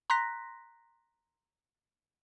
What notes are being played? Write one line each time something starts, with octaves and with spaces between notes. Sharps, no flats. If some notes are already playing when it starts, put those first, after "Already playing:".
A#5 C6 F#6 A#6 B6